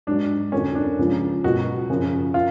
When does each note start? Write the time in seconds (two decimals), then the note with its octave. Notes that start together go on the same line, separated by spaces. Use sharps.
0.07 G#2 F#3 D4
0.52 F2 D3 F#3 C#4
0.75 D4
0.99 C#2 C#3 F3
1.44 C#2 B2 F#3 F#4
1.90 F#2 C#3 F3
2.34 F4